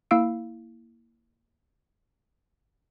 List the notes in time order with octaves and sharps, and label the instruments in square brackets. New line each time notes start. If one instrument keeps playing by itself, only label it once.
[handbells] A#3 E4 F5 E6 D7